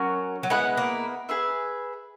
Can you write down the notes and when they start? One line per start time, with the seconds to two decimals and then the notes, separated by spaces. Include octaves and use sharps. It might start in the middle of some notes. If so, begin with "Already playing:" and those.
Already playing: F#3 C#4 F#4 A#4
0.43 F#3
0.50 G#3 B3 E4 B4 F#5
0.77 A#3
1.29 G#4 B4 E5